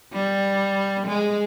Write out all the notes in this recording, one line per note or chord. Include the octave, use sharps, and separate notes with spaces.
G3
G#3